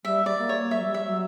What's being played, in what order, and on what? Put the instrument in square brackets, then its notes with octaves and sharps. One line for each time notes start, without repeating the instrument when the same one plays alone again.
[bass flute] G3 [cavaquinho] E5
[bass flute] G3 [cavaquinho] D5
[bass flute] A#3
[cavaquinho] C#5
[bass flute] G3 [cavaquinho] E5
[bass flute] F#3
G3
[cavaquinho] E5
[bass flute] F#3